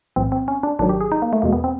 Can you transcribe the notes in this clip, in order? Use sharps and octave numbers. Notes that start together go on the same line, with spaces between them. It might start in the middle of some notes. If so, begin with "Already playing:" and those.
B1 A2 E3 C4
C4
C#4
D4
G#1 G#2 D#3 F#3 D4
G4
G#4
D#4
A#3
A3
E2 B2 G#3 A#3
B3
C4